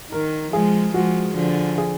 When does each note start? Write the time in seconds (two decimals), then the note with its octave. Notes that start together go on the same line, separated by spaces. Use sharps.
0.12 D#3 A#4
0.53 F3 G#3 G#4
0.94 F3 G#3 F#4
1.36 D3 F3
1.78 G#4